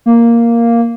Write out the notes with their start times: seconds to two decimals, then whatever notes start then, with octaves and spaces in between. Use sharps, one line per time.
0.06 A#3